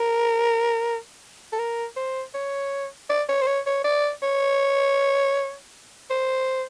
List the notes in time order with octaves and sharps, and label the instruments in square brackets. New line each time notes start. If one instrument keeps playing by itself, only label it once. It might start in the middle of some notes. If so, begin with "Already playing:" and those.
Already playing: [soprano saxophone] A#4
A4
A#4
C5
C#5
D5
C#5
C5
C#5
C#5
D5
C#5
C5